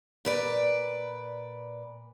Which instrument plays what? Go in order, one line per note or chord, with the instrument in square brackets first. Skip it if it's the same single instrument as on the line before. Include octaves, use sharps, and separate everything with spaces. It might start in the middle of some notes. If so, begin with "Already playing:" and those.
[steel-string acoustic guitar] A#2 B4 D5